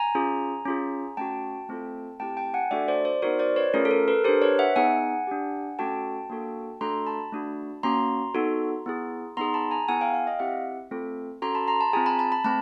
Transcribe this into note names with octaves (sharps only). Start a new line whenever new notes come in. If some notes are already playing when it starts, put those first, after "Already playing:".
Already playing: G#5 A#5
C#4 F4 G#4
C#4 F4 G#4
A3 C#4 F#4 G5 A5
A3 C4 F4 A4
A3 C4 E4 G4 G5 A5
G5 A5
F#5 G#5
A3 D4 F#4 A4 D5 E5
C5 D5
C5 D5
B3 D#4 F#4 A#4 C5
C5 D5
B4 C#5
A3 C#4 F4 G#4 A#4
A4
A#4
A4 B4
D4 G4 A#4 C5
B4 C#5
E5 F#5
B3 D#4 G#4 F#5 G#5
D4 G4
A3 C#4 F#4 A4 G5 A5
A#3 D4 F#4 A4
A3 D4 F#4 A4 A#5 C6
A5 B5
A3 D4 F#4
A#3 C#4 F#4 A#5 C6
B3 D#4 F#4 A4
B3 E4 G#4
B3 D#4 G#4 A#5 C6
A5 B5
G#5 A#5
B3 E4 G#4 F#5 G#5
F5 G5
F5 G5
D#5 F5
C4 E4 G4 E5 F#5
A3 C4 F4 A4
C#4 F#4 A4 A#5 C6
A5 B5
A#5 C6
A5 B5
C4 F4 G#4 G#5 A#5
A5 B5
A5 B5
A5 B5
A3 C4 A5 B5